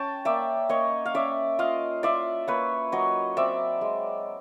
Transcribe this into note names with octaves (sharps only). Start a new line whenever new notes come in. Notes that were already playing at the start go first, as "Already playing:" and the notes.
Already playing: C#4 G5 A5
A#3 D5 E5
A#3 C#5 D#5
F5
C#4 D5 E5
F4 D#5 F5
F4 D5 E5
A#3 B4 C#5
F#3 C#5 D#5
C4 D5 E5
G#3